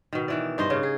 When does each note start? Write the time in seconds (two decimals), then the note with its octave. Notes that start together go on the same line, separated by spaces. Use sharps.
0.13 B2 D#3
0.28 D#3 E3 D5
0.58 G2 D#4 C5 D#5
0.70 C#3
0.83 G#4